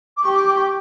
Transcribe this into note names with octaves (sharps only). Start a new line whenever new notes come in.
D6
G4 C#6
D6
D6
C#6